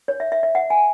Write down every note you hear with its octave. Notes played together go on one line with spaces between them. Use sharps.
C#5
E5
E5
E5
F#5
G#5